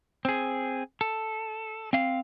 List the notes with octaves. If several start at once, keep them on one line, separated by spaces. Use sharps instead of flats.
C4 G#4
A4
C4 F5